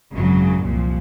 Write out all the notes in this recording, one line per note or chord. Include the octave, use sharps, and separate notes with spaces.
G#1 F#2 C#3 F#3
C2 A#2 F3